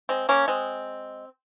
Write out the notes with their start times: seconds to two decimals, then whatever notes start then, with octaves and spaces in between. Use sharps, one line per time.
0.09 G#3 C4
0.29 A#3 C#4
0.48 G#3 C4